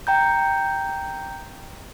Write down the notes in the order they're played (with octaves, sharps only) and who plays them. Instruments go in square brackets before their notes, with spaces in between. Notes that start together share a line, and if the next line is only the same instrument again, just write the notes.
[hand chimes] G5 A#5 G6